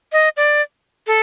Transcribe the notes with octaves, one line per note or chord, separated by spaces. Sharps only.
D#5
D5
A4